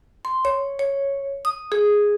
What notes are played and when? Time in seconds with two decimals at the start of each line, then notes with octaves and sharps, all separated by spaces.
0.25 C6
0.45 C#5
0.79 C#5
1.45 D#6
1.72 G#4